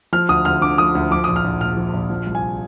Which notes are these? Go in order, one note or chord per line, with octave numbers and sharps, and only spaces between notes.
F3 F6
D2 D#6
D2 F6
D3 D6
F3 D#6
D2
F3 D6
A#1 D#6
F6
A#1
A#2 F6
F3
A#1
F3
C2
G#5